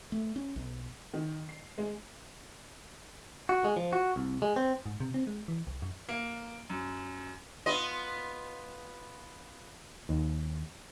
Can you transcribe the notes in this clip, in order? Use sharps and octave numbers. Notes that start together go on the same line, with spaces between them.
A3
C#4
B1
D#3
C7
G#3
F#4
G#3
F3
F#4
C2
G#3
C4
G#2
C3
C4
G#3
E3
C2
F#2
A#3
F#2
B3 F4 D#5
D#2